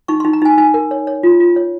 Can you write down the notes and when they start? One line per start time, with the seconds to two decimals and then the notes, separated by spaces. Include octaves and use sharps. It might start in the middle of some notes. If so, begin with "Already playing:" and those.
0.08 D#4 C#6
0.20 D#4 C6
0.33 A#5
0.42 D#4 G#5
0.58 D#4 G#5
0.74 A#4
0.91 C#5
1.07 C#5
1.23 F4
1.40 F4
1.56 C#5